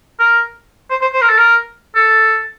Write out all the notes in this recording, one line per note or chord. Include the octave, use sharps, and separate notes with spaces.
A#4
C5
C5
C5
A#4
A4
A#4
A4